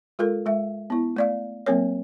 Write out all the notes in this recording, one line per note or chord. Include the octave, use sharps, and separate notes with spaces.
G#3 F4 A4 A#4
G#3 E5
B3 E4
A3 D5 F5
F#3 A#3 C4 A#4 C#5